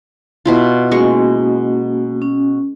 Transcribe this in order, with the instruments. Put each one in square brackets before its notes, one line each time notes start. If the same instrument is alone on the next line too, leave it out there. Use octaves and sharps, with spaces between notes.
[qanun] B2 E4 F4
[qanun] G#3 C#6 [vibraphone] A#3 C#4 F#4
[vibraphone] C#4